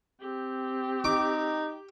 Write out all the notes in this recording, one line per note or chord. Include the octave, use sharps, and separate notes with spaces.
C4 G4
D#4 D6